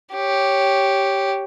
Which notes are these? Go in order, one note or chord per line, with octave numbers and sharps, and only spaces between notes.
G4 C#5